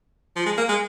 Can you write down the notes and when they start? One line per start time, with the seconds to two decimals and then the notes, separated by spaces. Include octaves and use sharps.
0.36 F3
0.46 G#3
0.58 A#3
0.69 G#3